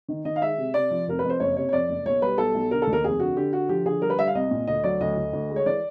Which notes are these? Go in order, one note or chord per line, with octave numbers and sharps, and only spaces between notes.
D#3
D#3 D#5
F5
G#3 E5
C3
C3 D5
F3
F1 A#4
F2 B4
C5
F#1 C#5
C3 C#5
C#5
F2 D5
F#1
B1 C#5
G3 B4
B1 A4
B1
D3 A#4
A4
D#2
A#4
F1 G#4
D3 F#4
D3 G4
D3 F#4
F3 G4
D3 G#4
G3 A#4
B4
G3 E5
F5
C2 D#5
A#2
D2 D#5
F#3 D5
D2 D#5
D2
D2
G#3
C#5
E3 D5